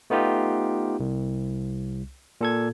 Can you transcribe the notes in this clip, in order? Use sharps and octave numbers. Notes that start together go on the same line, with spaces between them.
A3 B3 D#4 F4 G4
C2
A#2 A4 G#6